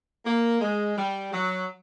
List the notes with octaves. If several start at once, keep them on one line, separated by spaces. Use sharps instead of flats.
A#3
G#3
G3
F#3